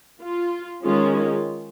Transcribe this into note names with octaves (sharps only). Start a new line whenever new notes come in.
F4
D#3 G#3 C#4 F4
F4